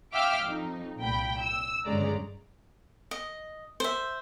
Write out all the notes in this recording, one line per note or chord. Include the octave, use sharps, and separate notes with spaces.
E5 F5 G5 D6 E6 F6
F2 D#4
C2 A#2 G5 B5
E6
G1 F#2 C#3 G#3 D5 A#5
D#5
C5 E5